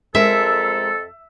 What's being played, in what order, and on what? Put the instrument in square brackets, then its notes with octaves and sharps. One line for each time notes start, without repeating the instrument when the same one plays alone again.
[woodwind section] F2 A4 [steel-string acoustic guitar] G#3 A#4 [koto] E5